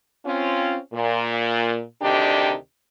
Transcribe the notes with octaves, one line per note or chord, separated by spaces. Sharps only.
C4 C#4 F4
A#2
D2 C3 D#3 D4 D#4 G4